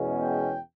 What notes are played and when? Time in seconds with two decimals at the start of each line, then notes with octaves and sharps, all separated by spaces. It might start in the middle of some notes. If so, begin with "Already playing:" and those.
Already playing: E2 B2 G#3 C#4
0.20 G5